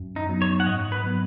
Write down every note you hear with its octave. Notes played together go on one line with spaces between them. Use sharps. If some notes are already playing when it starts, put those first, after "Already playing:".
Already playing: F#2
D#4
F#3 B3 D#4
C#5
F#5
G#2 D#5
B4
F#3 B3